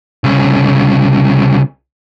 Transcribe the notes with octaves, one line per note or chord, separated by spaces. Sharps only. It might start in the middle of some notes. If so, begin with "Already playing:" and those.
C2 C#3